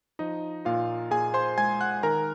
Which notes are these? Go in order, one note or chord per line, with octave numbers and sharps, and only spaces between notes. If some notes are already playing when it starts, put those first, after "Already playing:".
F3 D#4 D#5
A#2 F4 F5
A#2 G#4 G#5
C5 C6
G#3 G#5 G#6
F#5 F#6
D#3 A#4 A#5